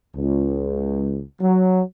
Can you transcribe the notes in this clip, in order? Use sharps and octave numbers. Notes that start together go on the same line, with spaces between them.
C#2
F#3